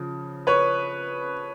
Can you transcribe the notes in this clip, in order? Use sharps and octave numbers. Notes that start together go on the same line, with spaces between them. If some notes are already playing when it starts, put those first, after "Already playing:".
Already playing: C#3 F3
B4 C#5